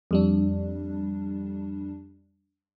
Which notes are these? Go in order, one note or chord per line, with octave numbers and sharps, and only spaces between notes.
F2 G3 D4